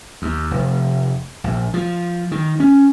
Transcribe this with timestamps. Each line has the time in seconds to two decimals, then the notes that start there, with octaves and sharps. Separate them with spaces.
0.22 D#2
0.51 F1
1.44 A#1
1.74 F3
2.32 D#3
2.60 C#4